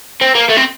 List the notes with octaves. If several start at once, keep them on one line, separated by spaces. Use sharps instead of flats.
C4
A#3
A3
C4